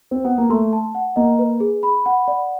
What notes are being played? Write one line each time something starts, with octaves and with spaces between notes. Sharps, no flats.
C4
B3
A#3
A3 C6
A5
F#5
A#3 D#5
B4
G#4
B5
F#5
D5